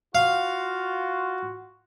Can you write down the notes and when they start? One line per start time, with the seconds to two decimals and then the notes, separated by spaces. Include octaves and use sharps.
0.15 F4 F#4 F5